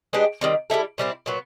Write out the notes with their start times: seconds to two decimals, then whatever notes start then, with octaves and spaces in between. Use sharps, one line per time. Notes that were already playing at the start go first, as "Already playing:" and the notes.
0.13 G#3 B3 D4 G4
0.41 D#3 G3 C4
0.70 G3 B3 E4 A4
0.98 A#2 G3 C4 E4
1.26 A#2 F#3 B3